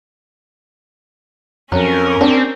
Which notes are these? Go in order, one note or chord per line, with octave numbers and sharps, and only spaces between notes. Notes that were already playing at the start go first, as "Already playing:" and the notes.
F2 F#3 C#4 A#4
C4 D4 G4